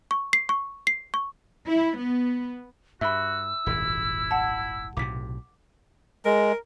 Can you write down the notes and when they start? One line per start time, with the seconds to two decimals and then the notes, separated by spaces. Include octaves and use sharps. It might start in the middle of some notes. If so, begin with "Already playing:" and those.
0.11 C#6
0.33 C7
0.49 C#6
0.87 C7
1.14 C#6
1.67 E4
1.98 B3
3.01 G2 F#4 E5 B5 E6
3.66 D#1 G#1 F#2 E4
4.31 F#5 A5
4.97 B1 A2 C3 D6 B6
6.25 G#3 A#4